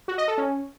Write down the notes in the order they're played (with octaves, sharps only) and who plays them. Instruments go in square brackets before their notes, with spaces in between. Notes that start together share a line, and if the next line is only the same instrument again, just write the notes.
[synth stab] F#4
D#5
A4
C#4